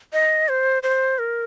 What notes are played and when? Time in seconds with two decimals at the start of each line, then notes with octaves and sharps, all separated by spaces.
0.13 D#5
0.49 C5
0.83 C5
1.19 A#4